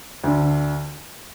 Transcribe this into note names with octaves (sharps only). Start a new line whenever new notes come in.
D2 D3